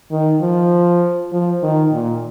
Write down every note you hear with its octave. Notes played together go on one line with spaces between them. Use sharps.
D#3
F3
F3
D#3
A#2